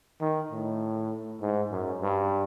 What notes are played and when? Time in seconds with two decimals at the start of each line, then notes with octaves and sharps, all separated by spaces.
0.21 D#3
0.51 A2
1.41 G#2
1.72 F#2
2.02 G2